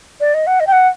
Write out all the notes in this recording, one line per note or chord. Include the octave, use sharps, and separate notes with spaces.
D5
D#5
F#5
D#5
G5
F#5